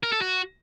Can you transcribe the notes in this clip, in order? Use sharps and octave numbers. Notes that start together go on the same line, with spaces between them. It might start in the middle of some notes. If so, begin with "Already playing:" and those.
A#4
A4
F#4